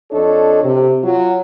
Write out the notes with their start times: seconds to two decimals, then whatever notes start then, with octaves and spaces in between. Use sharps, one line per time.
0.12 F2 D4 A4 C#5 D#5
0.64 C3
1.04 F#3 F4